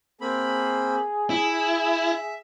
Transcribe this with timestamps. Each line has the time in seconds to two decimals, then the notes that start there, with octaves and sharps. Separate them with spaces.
0.21 A#3 C4 G#4 B5
1.30 E4 E5